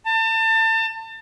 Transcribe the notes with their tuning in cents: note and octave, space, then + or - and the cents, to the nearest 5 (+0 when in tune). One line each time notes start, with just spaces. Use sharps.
A5 +30